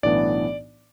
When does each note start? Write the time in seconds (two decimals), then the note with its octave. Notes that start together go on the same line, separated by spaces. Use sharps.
0.03 B1 A2 E3 B3 D4 D5